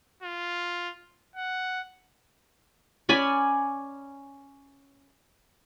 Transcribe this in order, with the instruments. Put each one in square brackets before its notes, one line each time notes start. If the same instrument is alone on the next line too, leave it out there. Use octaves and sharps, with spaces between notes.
[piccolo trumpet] F4
F#5
[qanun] C#4 D5 G#5 B5